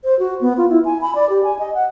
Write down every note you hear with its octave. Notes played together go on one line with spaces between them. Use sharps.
C5
F#4
B3
F4
E4
G#5
B5
D5
G4
G#5
D#5
F#5